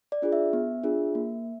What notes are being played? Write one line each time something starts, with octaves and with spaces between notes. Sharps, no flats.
D5
D4 F4 G#4
E5
B3
D4 F4 G#4
A#3